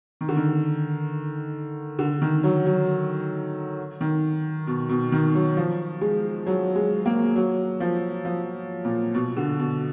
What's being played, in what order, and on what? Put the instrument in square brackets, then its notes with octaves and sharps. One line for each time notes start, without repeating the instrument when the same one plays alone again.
[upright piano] D#3
D3
D#3
D3
D#3
F#3
F#3
D#3
B2
B2
D#3
F#3
F3
G#3
F#3
G#3
A#3
F#3
F3
F3
A#2
B2
D3
B2